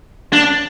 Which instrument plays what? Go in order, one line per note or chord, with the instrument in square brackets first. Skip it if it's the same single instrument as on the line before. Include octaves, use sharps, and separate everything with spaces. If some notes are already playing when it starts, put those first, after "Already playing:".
[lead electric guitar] D4